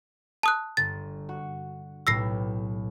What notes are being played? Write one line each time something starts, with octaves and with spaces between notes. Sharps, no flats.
A5 D#6 F#6
G1 A6
F#4
B1 A2 G4 E6 A#6 C7